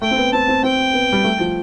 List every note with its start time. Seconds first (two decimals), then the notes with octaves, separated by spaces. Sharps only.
0.01 A3 G5
0.11 C4
0.17 B3
0.33 C4 A5
0.48 C4
0.63 C4 G5
0.93 B3
1.12 G3
1.24 A3
1.39 F3